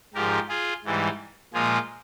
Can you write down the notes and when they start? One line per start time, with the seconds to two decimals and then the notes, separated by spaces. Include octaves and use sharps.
0.14 G#2 F3 G#3 G4 A#4
0.49 F4 G#4
0.85 G#2 E3 G3
1.53 A#2 F3 G#3 F4 G#4